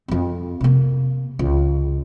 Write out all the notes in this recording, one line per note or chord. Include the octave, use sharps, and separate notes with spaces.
F2 C4
C3 A#3
C#2